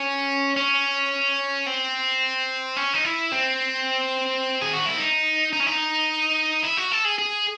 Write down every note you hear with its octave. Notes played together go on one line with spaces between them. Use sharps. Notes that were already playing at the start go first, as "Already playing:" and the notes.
Already playing: C#4
C#4
C4
C#4
D#4
E4
C4
G#4
F#4
E4
D#4
D#4
C#4
D#4
E4
F#4
A4
G#4
G#4